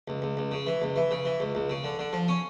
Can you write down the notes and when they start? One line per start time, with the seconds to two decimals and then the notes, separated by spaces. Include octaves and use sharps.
0.08 C#2
0.22 C#2
0.37 C#2
0.52 C#3
0.67 E3
0.82 C#2
0.96 E3
1.11 C#3
1.25 E3
1.40 C#2
1.55 C#2
1.70 C#3
1.84 D3
1.99 D3
2.13 F3
2.28 C#4